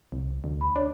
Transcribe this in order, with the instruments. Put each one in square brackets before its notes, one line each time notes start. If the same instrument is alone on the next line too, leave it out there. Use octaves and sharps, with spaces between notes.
[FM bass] C2
D2
[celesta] B5
[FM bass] D4 [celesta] C#5